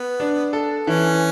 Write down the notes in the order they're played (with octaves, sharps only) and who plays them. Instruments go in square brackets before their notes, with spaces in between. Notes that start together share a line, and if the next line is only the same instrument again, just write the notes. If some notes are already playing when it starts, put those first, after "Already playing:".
Already playing: [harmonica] B3
[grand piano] D4
A4
[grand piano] E3 [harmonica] C#4